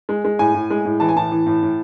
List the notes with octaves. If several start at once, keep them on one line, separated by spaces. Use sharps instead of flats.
G#3
G#3
A2 G#5
A2
G#3
A2
E3 A5
G#5
A2 A5
E3
A2
A2